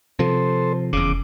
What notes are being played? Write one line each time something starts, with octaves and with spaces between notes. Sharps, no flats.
C3 F3 A4 C5
F1 E2 C#3 D6